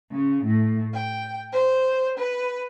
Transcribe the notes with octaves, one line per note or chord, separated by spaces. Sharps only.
C#3
A2
G5
C5
B4